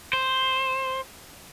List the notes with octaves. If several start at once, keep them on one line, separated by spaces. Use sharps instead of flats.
C5